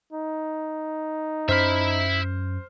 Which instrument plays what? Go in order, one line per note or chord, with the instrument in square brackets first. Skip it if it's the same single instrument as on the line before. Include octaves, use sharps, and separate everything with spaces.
[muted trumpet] D#4
[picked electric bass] F#2 C#4 [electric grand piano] C5 F6 [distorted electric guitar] E5 B5